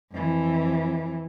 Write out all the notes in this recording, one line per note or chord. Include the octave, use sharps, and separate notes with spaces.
F2 E3